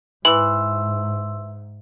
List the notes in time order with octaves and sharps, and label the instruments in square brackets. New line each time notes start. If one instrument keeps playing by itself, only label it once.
[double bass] G#2 [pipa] E3 [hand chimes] C6 E6 [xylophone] F#7